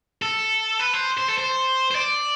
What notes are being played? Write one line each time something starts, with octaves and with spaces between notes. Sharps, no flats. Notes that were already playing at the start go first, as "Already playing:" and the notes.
A4
B4
C5
C5
A4
C5
C5
D5